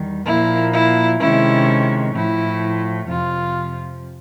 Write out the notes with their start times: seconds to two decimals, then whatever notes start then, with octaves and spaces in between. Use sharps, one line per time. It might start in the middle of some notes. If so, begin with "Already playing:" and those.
Already playing: E2 D#3 G3
0.25 A#2 F3 A#3 E4
0.73 E4
1.20 C3 D#3 G#3 C#4 E4
2.13 A2 F3 A3 E4
3.08 F2 C3 F3 F4